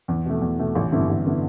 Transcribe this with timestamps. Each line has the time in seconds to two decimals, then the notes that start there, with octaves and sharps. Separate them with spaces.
0.08 E2
0.26 B2 A3
0.41 E2
0.59 B2 A3
0.75 A1
0.92 G2 D3 B3 E4
1.09 A1
1.26 D3 B3 E4